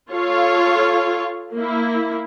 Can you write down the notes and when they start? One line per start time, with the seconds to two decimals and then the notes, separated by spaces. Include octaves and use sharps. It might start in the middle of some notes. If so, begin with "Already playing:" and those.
0.11 F4 A4 C#5 F5
1.55 A#3 E4